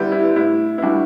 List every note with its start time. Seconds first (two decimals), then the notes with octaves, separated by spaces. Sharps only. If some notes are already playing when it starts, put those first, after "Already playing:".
Already playing: D3 G3 B3 E4 G4 B4
0.12 E4
0.35 A2 E4
0.78 E4
0.82 G3 B3 D4 F#4